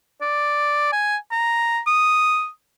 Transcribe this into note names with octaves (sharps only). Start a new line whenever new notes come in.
D5
G#5
A#5
D#6